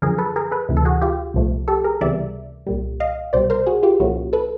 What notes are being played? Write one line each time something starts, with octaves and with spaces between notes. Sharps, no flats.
F#2 D3 F3 G#4 A#4
A4 B4
G#4 A#4
A4 B4
D2 C3 E3
A4
F#4 G#4
F4 G4
C2 A#2 F3 A3
G4 A4
G#4 A#4
C#2 C3 E3 G3 B3 D5 E5
C2 A#2 G3
D#5 F5
C2 B2 G3 C5 D5
A#4 C5
F#4 G#4
F4 G4
C2 A#2 F3 A#3 C#4 E4 F#4
A4 B4